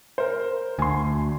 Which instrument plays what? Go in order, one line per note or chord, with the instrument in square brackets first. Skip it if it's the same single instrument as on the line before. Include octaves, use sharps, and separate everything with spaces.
[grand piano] A#4 C5
[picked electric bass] D2 [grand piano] G#5 C6